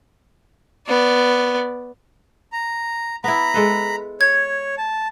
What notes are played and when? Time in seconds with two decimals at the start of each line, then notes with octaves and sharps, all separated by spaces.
0.87 B3 D5
2.53 A#5
3.24 B3 E4 A#5 B5
3.54 G#3 A4 B4
4.21 C#5 G#6
4.78 A5